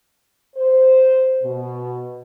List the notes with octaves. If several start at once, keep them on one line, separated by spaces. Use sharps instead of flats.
C5
B2